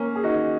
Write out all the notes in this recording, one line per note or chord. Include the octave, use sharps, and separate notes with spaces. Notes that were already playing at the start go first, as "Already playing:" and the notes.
Already playing: A#3 C#4
G#4
D#4 F#4